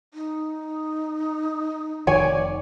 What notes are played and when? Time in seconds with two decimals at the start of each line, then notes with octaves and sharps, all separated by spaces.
0.14 D#4
2.07 F1 D#3 C#5 D5 G#5